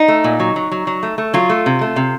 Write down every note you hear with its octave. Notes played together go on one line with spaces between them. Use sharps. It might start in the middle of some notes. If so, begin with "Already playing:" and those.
Already playing: D#4
A3
A#2
F#3
F#3
F#3
F#3
A3
A3
F#3 F4
A3
C3
A3
C3